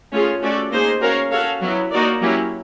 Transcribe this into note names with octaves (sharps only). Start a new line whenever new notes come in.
A3 C#4 F4 G#4
A3 C#4 F#4 A4 D5
A#3 D#4 G#4 C5
C#4 F#4 A#4 C#5 F5
C#4 F#4 A4 C#5 F5
F#3 B3 E4
A#3 D#4 F#4 A#4 D5
F#3 A#3 C#4 E4 G4